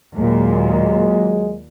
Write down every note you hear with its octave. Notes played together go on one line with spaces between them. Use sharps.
D#2 A#2 F#3 G#3